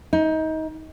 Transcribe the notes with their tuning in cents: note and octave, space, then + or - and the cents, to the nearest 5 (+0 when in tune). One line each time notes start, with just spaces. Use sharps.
D#4 +25